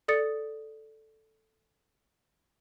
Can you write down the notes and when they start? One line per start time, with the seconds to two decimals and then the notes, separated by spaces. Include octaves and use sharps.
0.08 A4 D5 D#6 A6 C#7